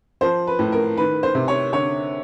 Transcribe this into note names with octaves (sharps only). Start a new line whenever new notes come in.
F3 C5
B4
A2
A#4
D#3 B4
C5
C3
C#5
D3 C#5